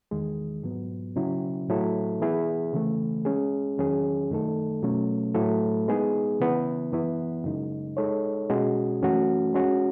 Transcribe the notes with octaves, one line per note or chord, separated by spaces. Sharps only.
E2 D#3 G#3
G#2 F#3 B3
C#3 F#3 C#4 E4
A2 F#3 A3 E4 A4
E3 B3 E4 G#4
C#3 E3 A3
G#3 C#4 G#4
E2 D#3 F#3 C#4 G#4
F#2 D#3 A3 D#4 A4
B2 F#3 A3 C#4
A2 F#3 A3 E4 A4
G#3 B3 D#4 G#4
C#3 E3 B3 E4
F#2 E3 B3 E4
F#2 C#3 G#3 D#4
G#3 D#4 A4 C#5
B2 G#3 C#4 F#4
F#2 E3 A3 C#4 F#4
G#3 C#4 F#4